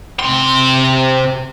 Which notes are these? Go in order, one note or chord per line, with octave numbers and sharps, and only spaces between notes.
C3 C6